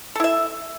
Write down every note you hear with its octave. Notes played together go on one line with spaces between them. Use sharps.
E4 A4 E5